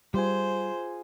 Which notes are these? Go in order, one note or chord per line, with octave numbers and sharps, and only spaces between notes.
G3 F4 G#4 C5